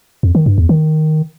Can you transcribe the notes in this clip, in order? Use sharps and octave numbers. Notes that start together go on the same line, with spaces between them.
F2
D#3
G2
E2
D#3